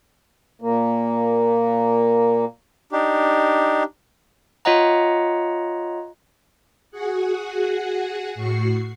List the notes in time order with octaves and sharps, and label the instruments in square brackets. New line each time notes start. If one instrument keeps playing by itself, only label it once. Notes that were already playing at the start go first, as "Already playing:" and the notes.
[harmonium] A#2 A#3
[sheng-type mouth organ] D4 D#4 G4
[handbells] F4 C#5 D#5 F#5 A#5
[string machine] F#4 G#4 F#5
A2 F#4 C#6 C7